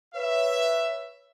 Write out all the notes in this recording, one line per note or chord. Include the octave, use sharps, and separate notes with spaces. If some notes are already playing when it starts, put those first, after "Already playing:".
B4 C#5 E5